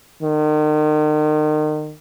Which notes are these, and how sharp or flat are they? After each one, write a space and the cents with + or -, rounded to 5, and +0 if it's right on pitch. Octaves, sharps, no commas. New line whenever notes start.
D#3 -35